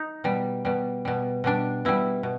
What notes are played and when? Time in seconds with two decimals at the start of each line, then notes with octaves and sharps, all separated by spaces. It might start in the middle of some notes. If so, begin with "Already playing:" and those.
Already playing: D#4
0.24 B2 G3
0.65 B2 G3
1.05 B2 G3
1.44 B2 G3 D4
1.85 B2 G3 E4
2.23 B2